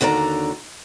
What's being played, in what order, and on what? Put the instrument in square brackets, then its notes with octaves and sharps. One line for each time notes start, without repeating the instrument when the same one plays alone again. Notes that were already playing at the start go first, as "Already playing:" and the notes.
[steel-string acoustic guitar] D#2 D3 F#4 D5 A#5